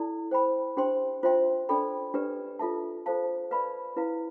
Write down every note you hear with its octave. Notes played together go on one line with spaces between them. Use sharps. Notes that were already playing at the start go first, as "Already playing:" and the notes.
Already playing: E4 A4 D5 A5
C5 G5 B5
D4 G4 C5 G5 C6
F4 C5 E5 G5 C6
D4 A4 D5 G5 B5
D4 G4 B4 D5
F4 A4 E5 A5
F4 A4 C5 F5 A5
B4 D5 F5 B5
E4 B4 F5